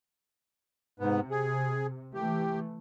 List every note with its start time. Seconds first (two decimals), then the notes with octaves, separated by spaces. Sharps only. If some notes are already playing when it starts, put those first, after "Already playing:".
1.00 G#2 C3 B3
1.31 G#4
2.14 E3 A3 G4